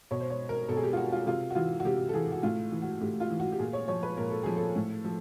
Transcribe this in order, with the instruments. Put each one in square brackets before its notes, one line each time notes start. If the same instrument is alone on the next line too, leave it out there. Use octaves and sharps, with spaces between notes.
[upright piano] B2 C#5
C5
C#5
A#4
B2 A4
G#4
G4
F4
F#4
F4
C3 F4
F#4
E3 F4
F#4
C3 G4
A4
E3 G#4
F#4
A2 F4
E3
F#4
A2 G4
F4
E3
F#4
G4
A#2 G#4
C#5
F3 C#5
B4
A#2 A#4
A4
F3 G#4
A4
A2
F3